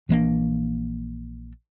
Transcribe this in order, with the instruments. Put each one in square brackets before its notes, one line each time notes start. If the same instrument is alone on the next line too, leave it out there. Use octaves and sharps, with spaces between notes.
[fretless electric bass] A#1 E3 A#3 D4